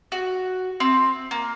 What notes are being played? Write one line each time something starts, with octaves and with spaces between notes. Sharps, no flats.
F#4
C4
A#3